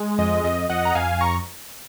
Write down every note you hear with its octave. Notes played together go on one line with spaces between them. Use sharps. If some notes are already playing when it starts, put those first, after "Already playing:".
Already playing: G#3
F2 D#5
F2 D#5
F2 D#5 F#5
A#5
F2 F5 G#5
A#5 C#6